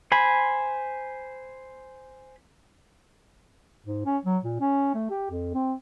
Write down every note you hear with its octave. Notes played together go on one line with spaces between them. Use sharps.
C5 G#5 B5
G#2
C#4
F#3
A#2
C#4
A3
G4
F2
C4